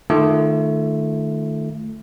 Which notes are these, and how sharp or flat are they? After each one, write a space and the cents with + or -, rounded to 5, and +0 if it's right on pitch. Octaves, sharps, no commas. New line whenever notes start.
D#3 -25 A3 +0 F4 -30